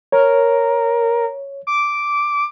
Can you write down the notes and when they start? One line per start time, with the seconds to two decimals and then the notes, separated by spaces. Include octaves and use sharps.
0.12 A#4 C#5
1.67 D6